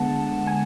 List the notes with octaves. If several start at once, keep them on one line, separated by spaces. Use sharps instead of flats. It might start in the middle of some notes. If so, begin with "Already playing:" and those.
Already playing: D3 G#3 B3 F#5 A5
G#5